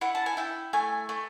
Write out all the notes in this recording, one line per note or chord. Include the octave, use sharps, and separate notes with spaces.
E4 F#5
A5
G#5
E4 G5
A3 G#5
A3